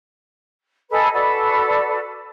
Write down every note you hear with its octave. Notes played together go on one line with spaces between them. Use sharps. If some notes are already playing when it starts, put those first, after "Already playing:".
G#4 A4 B4 D#5
F#4 A4 B4 D5